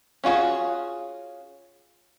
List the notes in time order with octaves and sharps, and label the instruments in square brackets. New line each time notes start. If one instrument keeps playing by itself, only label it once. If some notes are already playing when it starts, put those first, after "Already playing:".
[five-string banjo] C#4 F4 F#4 G#4